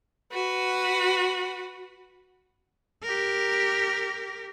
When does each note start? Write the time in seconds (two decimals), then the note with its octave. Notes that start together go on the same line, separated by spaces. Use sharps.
0.32 F#4 B4
3.02 G4 A#4